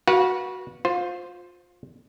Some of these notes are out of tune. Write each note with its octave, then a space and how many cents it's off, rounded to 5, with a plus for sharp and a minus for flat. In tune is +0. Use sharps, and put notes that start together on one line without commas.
F#4 +0 B4 -30 F5 +20
F4 +25 C5 +0